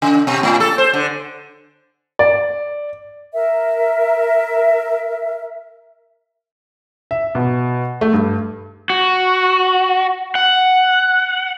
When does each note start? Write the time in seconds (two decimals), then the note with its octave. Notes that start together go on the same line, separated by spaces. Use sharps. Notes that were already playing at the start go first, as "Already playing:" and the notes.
0.02 C#3
0.27 B2
0.43 A2
0.60 A4
0.78 C5
0.94 D3
2.19 D5
3.33 A#4 E5
7.11 E5
7.35 B2
8.01 A3
8.13 G2
8.90 F#4
10.35 F#5